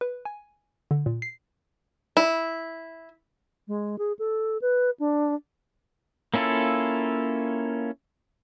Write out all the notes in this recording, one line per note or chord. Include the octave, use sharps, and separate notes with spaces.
B4
G#5
D3
A#2
C7
E4
G#3
G#4
A4
B4
D4
A#3 C#4 E4 F4 A4